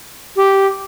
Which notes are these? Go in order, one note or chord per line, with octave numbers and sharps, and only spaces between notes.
G4